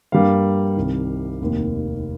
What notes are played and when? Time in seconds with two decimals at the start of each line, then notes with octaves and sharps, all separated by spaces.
0.12 G2 G3 A#3 F5
0.77 C2 C3 D#3
1.41 F1 D#2 D#3 A#3